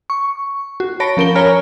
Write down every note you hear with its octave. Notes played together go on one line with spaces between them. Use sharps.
C#6
F#4
C#5 A5 B5 A#6 D7
F3 C#4 A#4 D7 G7
A#4 C#5 G#5 A#5 B5 F6